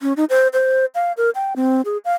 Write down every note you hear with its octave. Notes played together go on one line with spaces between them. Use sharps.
C#4
D#4
C5
C5
F5
A#4
G5
C4
G#4
F5